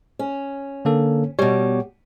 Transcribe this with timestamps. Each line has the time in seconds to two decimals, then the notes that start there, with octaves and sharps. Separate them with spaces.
0.19 C#4
0.85 D3 A#3 A4
1.39 B2 G3 C#5